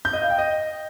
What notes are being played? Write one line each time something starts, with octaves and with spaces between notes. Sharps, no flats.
G6
D#5
F5
G5
D#5